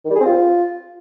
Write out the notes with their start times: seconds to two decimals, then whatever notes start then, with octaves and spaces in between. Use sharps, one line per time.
0.05 D#3
0.10 G3
0.15 G#4
0.21 C4
0.26 F4